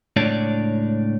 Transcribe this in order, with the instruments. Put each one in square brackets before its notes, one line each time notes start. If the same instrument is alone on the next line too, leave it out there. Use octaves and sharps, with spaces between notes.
[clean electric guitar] C#2 A2 D4 C#5 D5